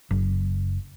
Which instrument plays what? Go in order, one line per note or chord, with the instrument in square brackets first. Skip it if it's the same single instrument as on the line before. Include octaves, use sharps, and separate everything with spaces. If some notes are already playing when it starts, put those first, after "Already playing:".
[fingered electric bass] F#1